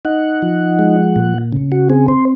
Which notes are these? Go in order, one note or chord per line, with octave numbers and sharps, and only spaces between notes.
D#4 F#5
F3
G#3
A#2
C#3
F#4
C4 G#4
C5